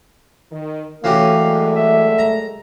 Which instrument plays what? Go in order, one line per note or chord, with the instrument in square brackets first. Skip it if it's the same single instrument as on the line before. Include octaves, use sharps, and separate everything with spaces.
[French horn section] D#3
[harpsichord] E3 F#4 G4 [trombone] A3 [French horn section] C#4 [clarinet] F5
[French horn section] F#2 G3 G#3
[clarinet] E5
[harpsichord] A#5